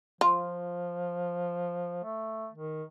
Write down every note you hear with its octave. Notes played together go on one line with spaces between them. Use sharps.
F3 F4
A3
D#3